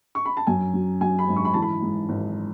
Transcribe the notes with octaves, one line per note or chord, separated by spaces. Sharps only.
C#6
B5
A5
F#2 G#5
F#3
F#3 G#5
B5
G#1
C#6
B5
E3 A5
B5
G#2
G#1